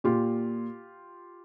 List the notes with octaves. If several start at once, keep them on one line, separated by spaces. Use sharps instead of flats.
A#2 F4 G4